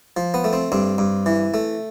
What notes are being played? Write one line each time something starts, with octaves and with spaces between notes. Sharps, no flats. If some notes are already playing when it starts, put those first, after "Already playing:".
F3
B3
A3
C4
G2 C4
G2
E3
A3